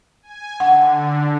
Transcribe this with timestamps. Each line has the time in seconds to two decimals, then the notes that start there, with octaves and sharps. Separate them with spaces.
0.22 G#5
0.60 D3 F#5